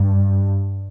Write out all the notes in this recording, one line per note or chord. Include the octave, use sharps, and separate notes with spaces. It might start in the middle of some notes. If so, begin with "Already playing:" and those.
Already playing: G2